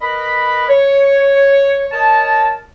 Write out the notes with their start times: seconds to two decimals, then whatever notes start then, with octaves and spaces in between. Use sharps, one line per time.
0.01 A#4 B4 D#5 B5
0.68 C#5
1.91 A#4 C#5 D#5 A5